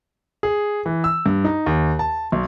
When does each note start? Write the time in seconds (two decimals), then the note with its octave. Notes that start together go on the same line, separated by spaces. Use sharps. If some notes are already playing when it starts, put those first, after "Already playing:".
0.43 G#4
0.86 E3
1.04 E6
1.26 G2
1.45 D#4
1.66 D#2
1.99 A5
2.32 B1